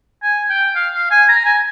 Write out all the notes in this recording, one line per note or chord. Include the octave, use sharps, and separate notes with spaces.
G#5
G5
F5
F5
G#5
A#5
G#5